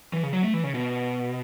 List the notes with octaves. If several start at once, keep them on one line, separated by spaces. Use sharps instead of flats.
E3
C#3
F#3
A3
E3
C#3
B2